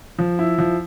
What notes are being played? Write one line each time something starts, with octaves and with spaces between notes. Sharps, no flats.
F3
E4
F3